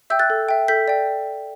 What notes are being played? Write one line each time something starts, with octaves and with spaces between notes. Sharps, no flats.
E5 G5 E6 G6
F#6 A6
A4
E5 G5
A4 G6 B6
D5 G5